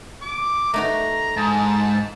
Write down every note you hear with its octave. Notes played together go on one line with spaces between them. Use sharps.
D6
A3 D#4 F#4 A#5
G#2 A5